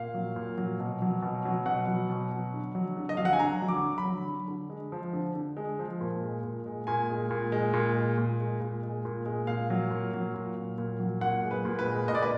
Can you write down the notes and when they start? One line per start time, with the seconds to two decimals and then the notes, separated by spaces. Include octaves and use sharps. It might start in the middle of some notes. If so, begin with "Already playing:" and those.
Already playing: A#2 F5
0.14 F#3
0.36 A#2
0.58 F#3
0.80 B2
1.02 F#3
1.22 B2
1.45 F#3
1.66 B2 F#5
1.88 F#3
2.10 B2
2.31 F#3
2.54 D3
2.75 F#3
2.97 D3
3.09 D#5
3.17 F#3 F5
3.25 F#5
3.33 G#5
3.39 D3 A#5
3.62 F#3
3.68 D6
3.83 D3
3.98 B5
4.05 F#3
4.27 D3
4.48 D3
4.70 G#3
4.92 F3
5.13 D3
5.35 D3
5.57 G#3
5.79 F3
6.01 A#2
6.22 G#3
6.43 A#2
6.66 G#3
6.87 A#2 G#5
7.09 G#3
7.31 A#2
7.52 G#3
7.74 A#2
7.96 G#3
8.18 A#2
8.39 G#3
8.60 A#2
8.83 G#3
9.05 A#2
9.26 G#3
9.47 A#2 F5
9.70 F#3
9.91 A#2
10.13 F#3
10.34 A#2
10.56 F#3
10.78 A#2
11.00 F#3
11.21 A#2 F#5
11.44 G#3
11.51 B4
11.65 A#2
11.79 B4
11.86 G#3
12.08 A#2 D#5
12.15 D5
12.22 B4